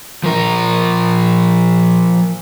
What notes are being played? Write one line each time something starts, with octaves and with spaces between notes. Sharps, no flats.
F3 A#4